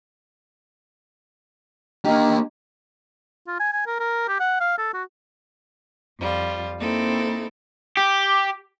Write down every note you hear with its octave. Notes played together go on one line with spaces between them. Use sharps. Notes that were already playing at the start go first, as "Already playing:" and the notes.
A#3 D4 G4 D#5 A#5
F4
G#5
G#5
A#4
A#4
G4
F#5
F5
A4
F#4
F2 G3 F4
A#3 C4 D#4 E4 A4
G4